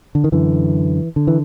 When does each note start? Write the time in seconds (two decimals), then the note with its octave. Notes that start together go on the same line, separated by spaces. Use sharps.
0.15 D3
0.24 D#3
0.32 F#2 D3 E3
1.16 D3
1.27 E3